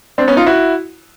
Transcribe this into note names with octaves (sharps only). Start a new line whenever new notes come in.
C4 D4
B3 C#4
D#4 F4
E4 F#4